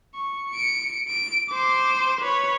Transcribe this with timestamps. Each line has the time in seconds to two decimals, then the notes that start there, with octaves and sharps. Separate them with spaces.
0.14 C#6
0.50 C#7 D7
1.08 D7
1.50 C5 D6
2.21 B4 C#5